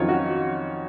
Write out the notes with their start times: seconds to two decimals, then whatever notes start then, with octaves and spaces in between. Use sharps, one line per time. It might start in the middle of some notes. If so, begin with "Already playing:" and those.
Already playing: F2 D#3 F#3 C#4 F4 C#5
0.09 F#4